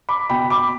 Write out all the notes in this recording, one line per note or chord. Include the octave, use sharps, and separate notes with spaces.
B5 D6
B2 G5 B5
B5 D6